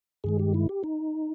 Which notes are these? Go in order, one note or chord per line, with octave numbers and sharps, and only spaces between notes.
G2 D#3 G#3 G#4
G4
E4
G4
D#4